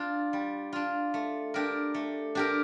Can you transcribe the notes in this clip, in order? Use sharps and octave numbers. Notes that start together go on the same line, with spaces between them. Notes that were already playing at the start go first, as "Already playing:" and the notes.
Already playing: D4 F4
G3
D4 F4
A3
D4 G4 A#4
A3
D4 G4 A#4